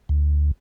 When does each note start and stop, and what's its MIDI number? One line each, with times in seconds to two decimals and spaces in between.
0.09 0.51 38